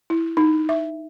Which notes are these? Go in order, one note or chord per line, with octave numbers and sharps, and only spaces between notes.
E4
D#4
E5